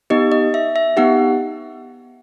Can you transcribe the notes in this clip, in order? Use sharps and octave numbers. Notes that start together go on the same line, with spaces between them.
B3 D#4 G4 D#5
D#5
E5
E5
B3 D#4 G4 F#5